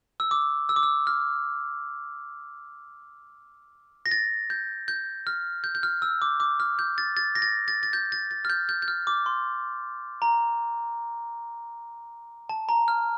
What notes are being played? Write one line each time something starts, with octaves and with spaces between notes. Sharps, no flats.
E6
D6
E6
D6
E6
F6
A#6
A6
G6
G6
F6
G6
G6
F6
E6
D6
D6
F6
G6
A6
A6
A#6
A6
A6
A6
G6
A6
A6
F6
G6
G6
G6
F6
D6
C6
A#5
A5
A#5
F6